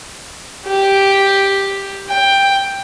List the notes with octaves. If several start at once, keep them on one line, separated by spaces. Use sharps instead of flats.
G4
G5